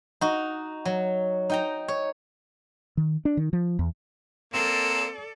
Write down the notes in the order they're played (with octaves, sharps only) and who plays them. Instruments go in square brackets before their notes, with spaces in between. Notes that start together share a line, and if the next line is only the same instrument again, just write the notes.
[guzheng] D#4 F#4
F#3
D#4 G5 A#5
C#5
[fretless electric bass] D#3
D4
D#3
F3
E2
[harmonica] A#3 [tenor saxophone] C4 [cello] A4 D5 [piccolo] E7